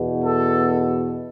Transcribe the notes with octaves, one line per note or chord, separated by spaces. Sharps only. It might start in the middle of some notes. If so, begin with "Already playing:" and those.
Already playing: E2 B2
A4